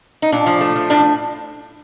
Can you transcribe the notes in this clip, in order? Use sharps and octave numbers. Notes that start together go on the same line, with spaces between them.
D#4
A#2 D4
F3
A3
F3
A2 D4